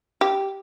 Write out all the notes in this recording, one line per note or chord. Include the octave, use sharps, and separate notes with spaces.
G4